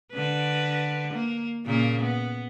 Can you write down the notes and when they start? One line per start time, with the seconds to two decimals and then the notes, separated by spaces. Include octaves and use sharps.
0.13 D3 B4
1.14 A#3
1.65 A#2 C#3 A#3
2.01 B3